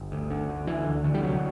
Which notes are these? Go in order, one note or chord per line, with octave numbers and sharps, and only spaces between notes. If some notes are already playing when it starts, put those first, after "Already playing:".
Already playing: G1
D2
D3
D2
D3 E3
D2
D3
G3
C2 F#3